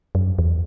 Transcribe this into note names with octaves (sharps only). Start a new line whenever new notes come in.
F#2
E2